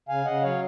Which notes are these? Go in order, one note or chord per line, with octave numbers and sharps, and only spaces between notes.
C#3 F5 G#5
C#3 D#5 F#5
F#3 C#5 F5